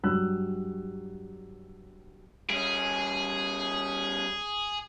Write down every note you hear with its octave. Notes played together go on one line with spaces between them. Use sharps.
G2 F#3 G3 E6 F#6
G3 C#4 G#4